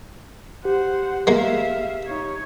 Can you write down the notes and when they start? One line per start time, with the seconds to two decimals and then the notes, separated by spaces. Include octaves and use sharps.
0.65 G4 C5 F#5
1.27 G#3 A#3 E5 F5
2.07 D#4 C#5